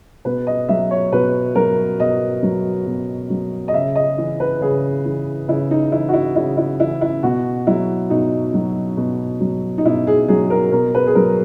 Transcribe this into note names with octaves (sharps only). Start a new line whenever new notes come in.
B2 B4
D#5
F#3 E5
C#5
B2 B4
F#3 A#4
B2 D#5
F#3
B2
F#3
D#5
C#3 E5
D#5
E3
B4
C#3 G#4
E3
C#3 E4
D#4
E3 E4
F#4
E4
C#3 E4
E4
E3 E4
E4
B2 F#4
F#3 E4
B2 D#4
F#3
B2
F#3
D#4
B2 E4
G#4
F#3 G#4
A#4
B2 A#4
B4
G#4
F#3 A#4